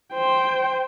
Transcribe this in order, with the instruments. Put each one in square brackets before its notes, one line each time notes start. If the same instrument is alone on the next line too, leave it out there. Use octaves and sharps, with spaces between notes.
[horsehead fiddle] C5 G5